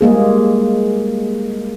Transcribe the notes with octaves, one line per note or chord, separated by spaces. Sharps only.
G3 G#3 A#3 G#4